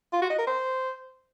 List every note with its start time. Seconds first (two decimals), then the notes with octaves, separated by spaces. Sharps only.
0.13 F4
0.22 F#4
0.30 D#5
0.38 A#4
0.47 C5